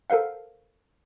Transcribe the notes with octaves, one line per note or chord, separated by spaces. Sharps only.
A4 A#4 C5 F5 F#5